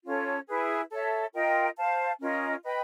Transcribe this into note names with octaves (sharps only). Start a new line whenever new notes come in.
C#4 F4 A4 C#5
E4 G#4 B4
A4 C#5 E5
F4 A#4 D#5 G5
C5 F5 A5
C#4 F4 A#4 D#5
B4 D#5 G5 B5